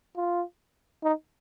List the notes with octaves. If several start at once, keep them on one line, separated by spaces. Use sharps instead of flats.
F4
D#4